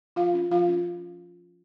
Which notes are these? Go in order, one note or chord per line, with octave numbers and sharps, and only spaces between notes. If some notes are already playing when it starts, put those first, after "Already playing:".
F3 F4 F5
C#4
F3 F4 F5
C#4